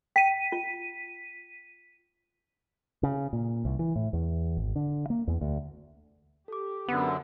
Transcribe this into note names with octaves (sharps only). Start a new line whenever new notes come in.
G5 B6 D#7
F4
C#3
A#2
C2
E3
A2
E2
G#1
D3
A#3
E2
D2
G4 A4 D6
F#2 D3 B3 F#5